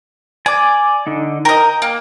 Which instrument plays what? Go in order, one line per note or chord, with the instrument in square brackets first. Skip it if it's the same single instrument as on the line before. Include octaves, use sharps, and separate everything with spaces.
[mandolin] D5 [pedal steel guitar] G#5 D6
[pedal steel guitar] D3 D#4
[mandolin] A#4 D#5 [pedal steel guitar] G5
[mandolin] A#3